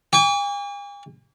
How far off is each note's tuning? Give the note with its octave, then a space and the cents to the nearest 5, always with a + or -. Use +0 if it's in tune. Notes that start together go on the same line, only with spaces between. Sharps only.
G#5 -45 D6 -45